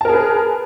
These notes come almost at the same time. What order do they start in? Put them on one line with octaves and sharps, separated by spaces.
A5 A#4 G#4 B4